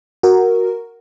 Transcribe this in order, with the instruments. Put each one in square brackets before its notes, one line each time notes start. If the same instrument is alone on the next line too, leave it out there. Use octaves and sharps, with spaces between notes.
[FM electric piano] F#4 A#4